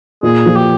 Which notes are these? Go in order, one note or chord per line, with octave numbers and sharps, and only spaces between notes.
A#2 G#4
F3
G4